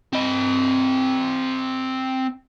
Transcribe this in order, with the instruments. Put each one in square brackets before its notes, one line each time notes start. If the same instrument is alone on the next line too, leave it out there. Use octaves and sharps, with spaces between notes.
[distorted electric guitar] C4 D#5